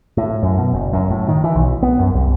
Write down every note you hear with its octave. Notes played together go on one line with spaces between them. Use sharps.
A2
F#2
B2
F#1
F#2
A2
D#3
E3
B1
B3
F#2
C2